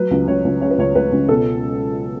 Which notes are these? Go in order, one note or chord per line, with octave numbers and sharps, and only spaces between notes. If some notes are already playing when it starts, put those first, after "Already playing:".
Already playing: F#3 B4
C#2
C#2 C#5
C#2
C#3 C#5
B4
C#2 C#5
C#2 B4
C#2
B2 A4